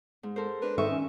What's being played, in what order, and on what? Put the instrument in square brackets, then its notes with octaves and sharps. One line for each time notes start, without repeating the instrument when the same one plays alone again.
[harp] G#2
A4 A#4 C5
[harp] D4 A#4 [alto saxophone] B4
[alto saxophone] D#3 [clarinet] A4 [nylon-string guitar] E5 [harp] C#6
[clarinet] C#4